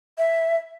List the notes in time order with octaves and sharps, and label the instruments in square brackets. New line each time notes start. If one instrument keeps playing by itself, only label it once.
[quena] E5